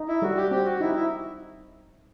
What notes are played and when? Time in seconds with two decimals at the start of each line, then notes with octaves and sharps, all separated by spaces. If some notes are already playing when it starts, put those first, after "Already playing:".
Already playing: D#4
0.08 E4
0.22 G3 F#4
0.37 G4
0.51 C4 G4
0.65 F#4
0.80 D#4 E4
0.95 E4